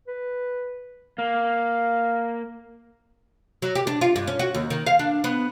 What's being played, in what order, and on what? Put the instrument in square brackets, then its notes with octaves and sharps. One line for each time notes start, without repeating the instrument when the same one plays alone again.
[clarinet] B4
[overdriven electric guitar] A#3 [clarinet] F5
[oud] F#3
G4
D4
F4
G2
C#4
F#4
D#2
D#3
F5
D4
B3